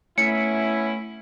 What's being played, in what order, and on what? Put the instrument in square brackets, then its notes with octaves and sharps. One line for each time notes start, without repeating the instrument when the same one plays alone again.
[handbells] A3 B6 [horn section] B3 C#4 E4 [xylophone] C#7